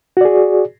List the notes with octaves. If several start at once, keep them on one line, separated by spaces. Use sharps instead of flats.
F#4 G#4 D5